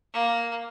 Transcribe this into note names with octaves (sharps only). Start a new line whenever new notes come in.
A#3